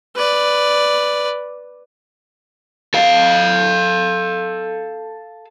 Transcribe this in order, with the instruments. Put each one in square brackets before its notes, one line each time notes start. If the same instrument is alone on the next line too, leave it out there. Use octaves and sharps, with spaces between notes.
[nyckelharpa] B4 D5
[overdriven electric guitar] A4 F5